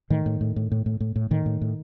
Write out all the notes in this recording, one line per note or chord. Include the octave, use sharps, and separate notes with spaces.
A2 D#3
A2
A2
A2
A2
A2
A2
A2
A2 D#3
A2
A2